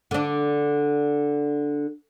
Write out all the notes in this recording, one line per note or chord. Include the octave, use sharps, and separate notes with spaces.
D3 D4